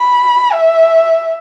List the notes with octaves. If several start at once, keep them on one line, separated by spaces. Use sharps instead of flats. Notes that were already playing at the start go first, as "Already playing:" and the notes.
Already playing: B5
E5